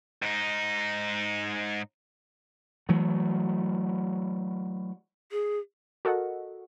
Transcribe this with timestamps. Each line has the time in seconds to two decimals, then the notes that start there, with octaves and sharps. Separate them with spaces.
0.22 G#2 D#4
2.89 E3 F#3 A3
5.32 G#4
6.05 F#4 A4 A#4 D#5 F#5